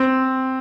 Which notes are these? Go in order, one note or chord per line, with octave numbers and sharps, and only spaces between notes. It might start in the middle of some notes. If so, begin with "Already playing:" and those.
Already playing: C4